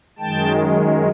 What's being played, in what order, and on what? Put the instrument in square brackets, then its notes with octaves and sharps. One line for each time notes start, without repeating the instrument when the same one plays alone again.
[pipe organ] F#2 D#3 G#3 G5 A5